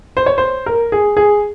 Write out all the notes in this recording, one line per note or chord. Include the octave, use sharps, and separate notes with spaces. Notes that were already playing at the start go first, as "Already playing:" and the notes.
C5
C#5
C5
A#4
G#4
G#4